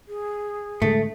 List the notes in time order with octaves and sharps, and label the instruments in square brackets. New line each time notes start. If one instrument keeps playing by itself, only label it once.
[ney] G#4
[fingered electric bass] A2 D3 G#3 [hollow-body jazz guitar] A3